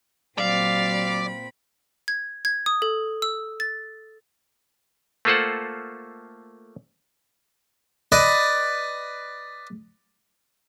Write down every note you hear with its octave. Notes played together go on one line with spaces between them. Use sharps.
A#2 F#3 C4 D5 F5 B5
G#6
G#6
D#6
A4
E6
A6
A3 A#3 F4 A4 C5 F#5
B4 D5 D#5